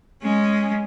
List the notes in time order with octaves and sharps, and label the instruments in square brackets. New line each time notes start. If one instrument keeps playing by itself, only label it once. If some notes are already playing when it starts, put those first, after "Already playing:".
[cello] G#3 C#4